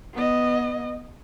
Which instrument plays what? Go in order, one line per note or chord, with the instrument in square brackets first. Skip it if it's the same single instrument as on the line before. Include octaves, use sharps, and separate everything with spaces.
[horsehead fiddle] B3 D#5